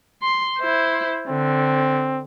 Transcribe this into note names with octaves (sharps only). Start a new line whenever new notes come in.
C6
E4 C5
D3 C4